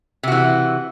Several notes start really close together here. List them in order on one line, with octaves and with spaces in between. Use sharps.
C3 F#4 E3